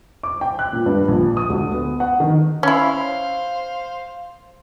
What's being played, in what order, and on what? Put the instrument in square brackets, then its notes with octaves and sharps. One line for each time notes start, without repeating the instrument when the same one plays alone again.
[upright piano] D6
G5
F#6
A#2
G2
A#1
D#6
D2
B3
F#5
D#3
[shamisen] C#4 E4 [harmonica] C5 F5